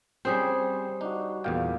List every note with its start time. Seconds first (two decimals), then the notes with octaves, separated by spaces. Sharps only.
0.25 G3 C4 C#4 G#4 C5
1.01 D4 D#4 F#4
1.44 E2 A#2 F5 G5